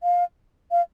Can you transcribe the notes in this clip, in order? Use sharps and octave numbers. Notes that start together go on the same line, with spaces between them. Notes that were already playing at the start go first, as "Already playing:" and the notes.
F5
F5